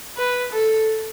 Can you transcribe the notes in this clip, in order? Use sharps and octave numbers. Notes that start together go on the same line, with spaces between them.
B4
A4